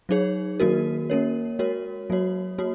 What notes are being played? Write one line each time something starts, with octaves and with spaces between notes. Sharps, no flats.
F#3 D#4 G#4 C#5
D#3 F#3 A#3 F#4 A#4
A#3 C#4 A#4 C#5
G#3 F#4 A#4 C#5
F#3 A#3 F#4 C#5
A#3 F#4 C#5